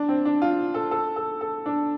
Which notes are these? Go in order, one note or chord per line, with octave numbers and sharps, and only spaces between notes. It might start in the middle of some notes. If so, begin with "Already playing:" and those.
Already playing: D4
C4
D4
F4
A4
A4
A4
A4
D4